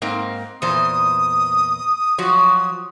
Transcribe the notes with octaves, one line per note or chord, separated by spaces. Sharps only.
G#2 A#3 C4
E2 A#2 C5 D#6
F3 F#3 F#4